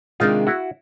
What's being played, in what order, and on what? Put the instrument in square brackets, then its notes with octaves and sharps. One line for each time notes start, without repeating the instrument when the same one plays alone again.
[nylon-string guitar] C3 D#3 G#3 B3 D4 [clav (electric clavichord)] D#4 F4
[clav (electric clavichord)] E4 F#4